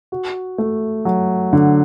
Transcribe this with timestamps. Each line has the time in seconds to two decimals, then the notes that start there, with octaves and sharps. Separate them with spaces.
0.12 F#4
0.58 A3
1.05 F#3
1.53 D3